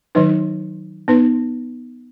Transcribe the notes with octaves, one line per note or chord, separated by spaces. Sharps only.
D#3 F#3 D#4 B4
B3 D#4 B4